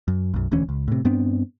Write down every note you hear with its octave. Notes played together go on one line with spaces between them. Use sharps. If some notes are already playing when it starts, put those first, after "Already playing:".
F#2
B1 F#2
E1 D2 E3 C#4
C#2
A2 C3
G2 B3 C4 D4